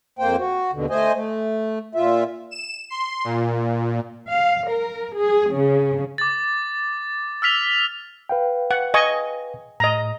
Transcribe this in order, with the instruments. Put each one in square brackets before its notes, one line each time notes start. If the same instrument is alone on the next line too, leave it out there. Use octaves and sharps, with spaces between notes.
[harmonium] F2 A#3 C5 G5
F#4
D#2 B2 D3
A3 C5 D#5 G#5
A3
A#2 F4 E5
[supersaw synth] E7
C6
A#2
[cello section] F5
A#4
G#4
C#3
[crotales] D6 A6
E6 F6 B6 F7
[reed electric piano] B4 F5 G5
[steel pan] F#5
D#5 G#5 C#6
[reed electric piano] A2 [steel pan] D#5 A#5